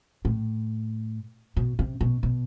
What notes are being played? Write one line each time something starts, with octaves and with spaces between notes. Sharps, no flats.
A2
B2
C3
B2
B2